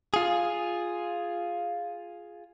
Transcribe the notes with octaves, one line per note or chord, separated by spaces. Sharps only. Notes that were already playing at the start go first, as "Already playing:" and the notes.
F4 G#4